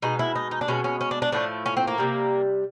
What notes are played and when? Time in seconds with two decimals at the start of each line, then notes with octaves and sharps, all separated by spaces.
0.02 B2 G#3 D#4
0.19 E4
0.36 D#4
0.51 D#4
0.61 D4
0.68 B2 G#3 C#4
0.84 C#4
1.01 C#4
1.11 D4
1.22 D4
1.32 A2 F3 A3 D4
1.66 C#4
1.77 C4
1.87 A#3
1.98 D#3 G3
2.03 C3